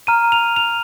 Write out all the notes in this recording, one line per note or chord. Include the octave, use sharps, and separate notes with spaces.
A#5 F6 D#7
F7
F7